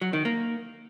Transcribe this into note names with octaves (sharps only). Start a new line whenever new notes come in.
F#3
D#3
A#3